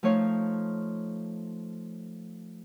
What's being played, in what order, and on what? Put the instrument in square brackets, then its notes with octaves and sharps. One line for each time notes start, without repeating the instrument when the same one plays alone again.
[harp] F3 A3 D#4 C#5 F5